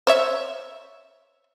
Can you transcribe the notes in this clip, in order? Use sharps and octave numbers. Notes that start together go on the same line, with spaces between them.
C5 C#5 E5